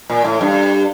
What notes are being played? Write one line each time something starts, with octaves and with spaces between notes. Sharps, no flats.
A#2
A2
G2